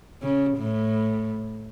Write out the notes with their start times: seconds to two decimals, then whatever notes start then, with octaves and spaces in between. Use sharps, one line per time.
0.23 C#3
0.57 A2